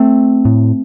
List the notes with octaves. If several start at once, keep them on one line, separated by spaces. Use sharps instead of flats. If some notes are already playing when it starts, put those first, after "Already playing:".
Already playing: A3 C4
A2